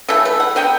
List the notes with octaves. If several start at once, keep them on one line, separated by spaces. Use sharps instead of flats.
C#3 E3 A3 A4
B4
F#5
D3 F#3 B3 G5